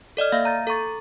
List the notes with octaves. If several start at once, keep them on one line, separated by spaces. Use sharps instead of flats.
A4 D5 D#5 F6
A#3 E5 F5 A#6
A#5 G6 A6
A4 A#5 C#6 A6